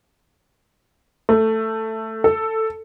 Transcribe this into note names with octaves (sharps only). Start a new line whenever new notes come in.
A3
A4